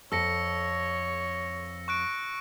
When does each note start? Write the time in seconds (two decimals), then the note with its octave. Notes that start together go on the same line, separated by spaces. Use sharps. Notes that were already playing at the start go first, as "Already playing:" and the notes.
0.12 F2 A4 C#5 E6 A#6 C#7
1.88 C#6 F#6 D7